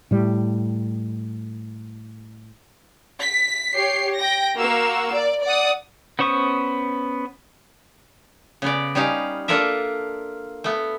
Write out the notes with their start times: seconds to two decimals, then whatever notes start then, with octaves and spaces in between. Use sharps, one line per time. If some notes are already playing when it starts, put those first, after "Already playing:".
0.11 A2 G3
3.21 B6
3.74 G4 C#5 C7
4.17 G5 A#6
4.56 A#3 F#4 E6
5.13 D5
5.44 D5 F#5 D#6
6.19 B3 C#4 C5 C#6 D#6
8.62 C#3 B3 D5
8.95 G3 C#4 D#4 F5
9.48 A#3 D4 F4 A4 A#4 E5
10.64 A3 B3